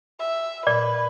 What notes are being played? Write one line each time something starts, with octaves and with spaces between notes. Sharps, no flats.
E5
A#2 B4 D5